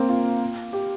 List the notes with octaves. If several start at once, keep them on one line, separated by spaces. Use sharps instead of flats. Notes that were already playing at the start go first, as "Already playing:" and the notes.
Already playing: A#3 C4
F4
G4